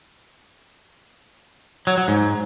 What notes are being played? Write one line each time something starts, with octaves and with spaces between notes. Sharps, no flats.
F#3
F#3
G#2